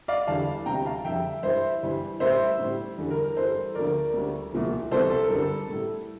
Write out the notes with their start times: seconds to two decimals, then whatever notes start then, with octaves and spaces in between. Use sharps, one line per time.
0.08 D5 F5
0.27 E2 D3 G3 F5 A5
0.66 D2 C3 E3 G3 G5 A#5
0.85 F5 A5
1.05 F2 D3 G3 E5 G5
1.43 G2 E3 G3 C5 E5
1.83 G2 E3 G3
2.20 A2 G3 C5 E5
2.59 A2 G3
2.98 E2 D3 G3
3.11 A#4
3.24 A#4
3.36 G2 E3 G3 A4 C5
3.75 D2 D3 F3 A#4 D5
4.13 D2 D3 G3
4.53 C2 A#2 F3
4.91 C2 C3 F3 A4 C5
5.10 A4
5.24 A#4
5.30 G2 D3 G3
5.39 A4
5.69 A2 G3